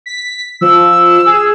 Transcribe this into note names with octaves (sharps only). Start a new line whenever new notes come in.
B6
F3 E6
G#4